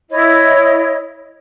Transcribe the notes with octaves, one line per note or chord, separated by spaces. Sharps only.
E4 C#5 D#5